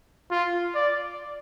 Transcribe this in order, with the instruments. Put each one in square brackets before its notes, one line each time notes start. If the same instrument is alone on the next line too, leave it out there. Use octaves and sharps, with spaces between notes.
[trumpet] F4
D5